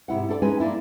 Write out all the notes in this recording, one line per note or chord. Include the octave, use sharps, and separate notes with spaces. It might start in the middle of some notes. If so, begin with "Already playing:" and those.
G#2 C3 E4 F#5
D4 E4 A4 C#5 D5
G#3 C#4 D#4 G#4 B4 G#5
G#3 A#3 C4 D4 E4